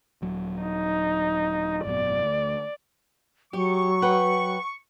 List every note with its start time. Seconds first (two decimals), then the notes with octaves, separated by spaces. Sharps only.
0.22 D#1 F#3
0.62 D#4
1.85 G#1 F#2 B2 D5
2.24 D2
3.53 F#3 G4 C#6
4.02 B4 F#5 G5